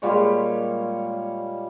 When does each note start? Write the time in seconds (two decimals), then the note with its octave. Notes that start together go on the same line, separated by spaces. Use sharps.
0.02 A#2 G3 G#3 C#5